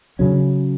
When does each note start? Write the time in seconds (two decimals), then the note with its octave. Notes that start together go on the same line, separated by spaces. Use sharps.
0.19 C#3 F#3 C#4